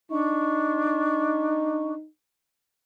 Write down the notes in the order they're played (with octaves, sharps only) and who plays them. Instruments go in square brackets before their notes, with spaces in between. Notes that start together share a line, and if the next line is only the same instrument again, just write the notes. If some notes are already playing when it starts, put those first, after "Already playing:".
[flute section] D4 C#6 [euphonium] D#4